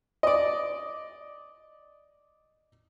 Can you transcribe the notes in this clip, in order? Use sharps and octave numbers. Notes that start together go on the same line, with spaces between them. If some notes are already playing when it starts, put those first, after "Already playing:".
D5 D#5